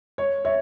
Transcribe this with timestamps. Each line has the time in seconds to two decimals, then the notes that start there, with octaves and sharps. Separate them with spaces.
0.18 C#5
0.45 C#5 E5